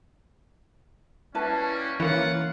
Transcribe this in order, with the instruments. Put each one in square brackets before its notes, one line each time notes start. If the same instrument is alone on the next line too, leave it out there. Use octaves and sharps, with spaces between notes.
[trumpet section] G3 A#3 C#4 [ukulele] E4 B4 A5
[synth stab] E3 A#3 [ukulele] C#4 [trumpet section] F4 F#5